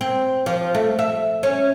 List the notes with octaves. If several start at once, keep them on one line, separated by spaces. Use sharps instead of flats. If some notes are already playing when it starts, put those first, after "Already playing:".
C4
F3
A3
E5
C#4